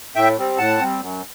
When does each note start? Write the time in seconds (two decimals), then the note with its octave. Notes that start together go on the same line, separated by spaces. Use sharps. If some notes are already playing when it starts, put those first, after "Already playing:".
0.16 A2 E5 G5
0.38 G3 C4
0.58 A2 F#5 A5
0.79 G3 C4
1.01 F#2